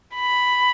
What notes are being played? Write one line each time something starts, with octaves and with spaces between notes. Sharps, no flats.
B5